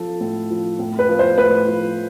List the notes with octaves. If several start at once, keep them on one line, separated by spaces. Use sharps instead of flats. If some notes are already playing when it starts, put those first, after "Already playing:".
Already playing: F3 A4
A2
F3
A2
B4
F3
C5
A2 B4
F3